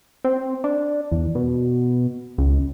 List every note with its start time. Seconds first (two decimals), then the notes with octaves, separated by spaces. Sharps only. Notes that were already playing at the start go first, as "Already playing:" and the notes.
0.24 C4
0.64 D4
1.12 E2
1.35 B2
2.38 C#2